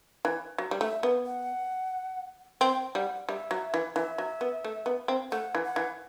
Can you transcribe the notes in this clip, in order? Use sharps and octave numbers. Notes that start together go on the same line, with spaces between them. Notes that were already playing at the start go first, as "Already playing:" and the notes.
E3
F#3
G3
A3 E5
B3
F#5
C4 G5
G3 F#5
G3 E5
F#3
E3
E3 E5
F#3
B3
A3
B3
C4
A3 F#5
E3
F#5
E3